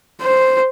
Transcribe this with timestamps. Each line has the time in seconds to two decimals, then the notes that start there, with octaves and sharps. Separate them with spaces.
0.21 C5